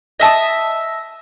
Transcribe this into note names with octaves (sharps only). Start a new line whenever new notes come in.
D#5 E5 A5 D#6